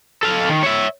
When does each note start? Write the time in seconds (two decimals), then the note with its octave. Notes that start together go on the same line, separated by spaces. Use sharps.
0.23 A4 F5
0.49 D#3
0.63 C#5 E5